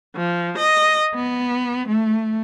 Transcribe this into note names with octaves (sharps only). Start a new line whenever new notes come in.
F3
D#5
B3
A3